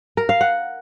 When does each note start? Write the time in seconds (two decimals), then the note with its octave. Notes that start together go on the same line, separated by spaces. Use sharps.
0.17 A#4
0.29 F5
0.41 F#5